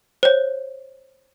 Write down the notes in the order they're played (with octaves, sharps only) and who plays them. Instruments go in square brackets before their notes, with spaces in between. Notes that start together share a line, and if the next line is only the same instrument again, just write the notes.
[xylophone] C5 C#5